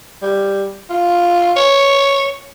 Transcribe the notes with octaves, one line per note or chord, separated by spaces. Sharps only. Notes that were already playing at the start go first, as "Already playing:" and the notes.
G3
F4
C#5